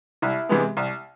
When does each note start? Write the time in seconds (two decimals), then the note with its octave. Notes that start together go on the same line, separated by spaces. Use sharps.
0.22 C2 E4
0.49 C3 E3 G#3 B3
0.77 C2